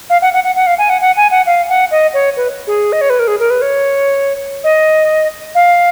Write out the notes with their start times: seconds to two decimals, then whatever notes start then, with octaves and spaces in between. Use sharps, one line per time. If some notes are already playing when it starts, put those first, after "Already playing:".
0.10 F5
0.22 F#5
0.33 F#5
0.44 F#5
0.56 F#5
0.67 F5
0.78 G#5
0.90 F#5
1.01 F#5
1.17 G#5
1.31 F#5
1.46 F5
1.69 F#5
1.91 D#5
2.14 C#5
2.37 B4
2.67 G#4
2.92 D#5
3.01 C#5
3.10 B4
3.19 A#4
3.27 G#4
3.39 A#4
3.50 B4
3.62 C#5
4.64 D#5
5.55 F5